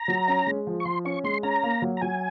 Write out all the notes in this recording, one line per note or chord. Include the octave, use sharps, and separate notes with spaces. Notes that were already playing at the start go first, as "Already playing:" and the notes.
Already playing: A#5
F#3
C#4
G#3
F3
C#6
F3 C6
C#4 C#6
G#3 C6
C#4 A#5
A#3
F#3
A#5
F#3 G#5